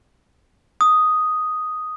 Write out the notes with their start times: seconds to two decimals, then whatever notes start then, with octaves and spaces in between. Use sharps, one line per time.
0.81 D#6